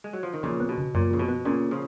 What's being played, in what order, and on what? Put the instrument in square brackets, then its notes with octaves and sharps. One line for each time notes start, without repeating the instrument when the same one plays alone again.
[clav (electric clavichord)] G#3
F#3
F3
D#3
[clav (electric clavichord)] A#2 C#3 [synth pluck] F3
[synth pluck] B3
[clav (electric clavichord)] B2
[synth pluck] C#3
[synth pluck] F#2 [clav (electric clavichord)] A#2
[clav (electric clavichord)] C#3 [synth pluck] F3
[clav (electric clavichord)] B2
[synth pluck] B3
[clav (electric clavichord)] A#2 C#3 [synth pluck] C#4
[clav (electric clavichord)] C#3 F3